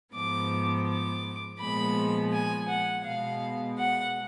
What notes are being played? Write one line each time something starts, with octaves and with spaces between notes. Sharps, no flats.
G#2 F3 B3 D6
D6
A#2 F3 G#3 B3 B5
G#5
F#5
B2 G#3 B3 F5
F#5